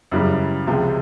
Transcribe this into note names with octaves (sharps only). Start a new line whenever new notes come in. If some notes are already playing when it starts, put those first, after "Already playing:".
F#2 C#3 E3 G3
C#2 C3 F3 G#3